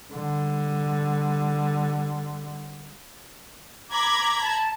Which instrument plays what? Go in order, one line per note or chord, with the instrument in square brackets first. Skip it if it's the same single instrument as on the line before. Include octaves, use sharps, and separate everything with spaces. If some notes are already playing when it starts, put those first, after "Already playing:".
[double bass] D3 G3
[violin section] A#5 B5 G#6 [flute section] D6
[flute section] A5